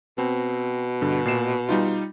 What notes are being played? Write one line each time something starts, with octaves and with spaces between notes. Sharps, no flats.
B2 C4
G2 D3
A#2 C7 E7
G3 D#4 F4